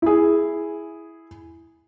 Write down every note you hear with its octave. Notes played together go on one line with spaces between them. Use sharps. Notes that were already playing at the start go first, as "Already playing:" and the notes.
E4 G#4